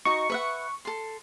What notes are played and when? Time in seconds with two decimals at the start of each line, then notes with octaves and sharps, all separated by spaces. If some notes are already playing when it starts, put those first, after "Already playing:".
0.05 D#4 F#4 D#5 C#6
0.30 B4 E5 F#5
0.85 A4 C6